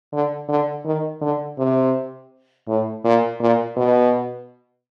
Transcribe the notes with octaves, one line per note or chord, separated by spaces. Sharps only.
D3
D3
D#3
D3
C3
A2
A#2
A#2
B2